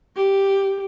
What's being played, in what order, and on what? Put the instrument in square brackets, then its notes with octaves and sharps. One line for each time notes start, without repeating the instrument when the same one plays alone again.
[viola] G4